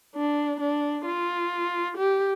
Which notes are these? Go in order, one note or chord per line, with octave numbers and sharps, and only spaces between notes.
D4
D4
F4
G4